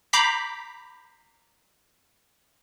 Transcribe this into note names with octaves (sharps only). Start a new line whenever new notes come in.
A#5 B5 D6 G6 B6 C7